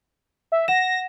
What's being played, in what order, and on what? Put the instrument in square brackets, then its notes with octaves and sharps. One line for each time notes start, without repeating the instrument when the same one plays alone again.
[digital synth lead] E5
[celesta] F#5 E7 [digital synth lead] A#6